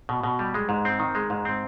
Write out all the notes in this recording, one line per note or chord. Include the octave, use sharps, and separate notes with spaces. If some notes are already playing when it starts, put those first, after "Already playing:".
B2
B2
G3
G#3
G#2
C4
D#3
G#3
G#2
C4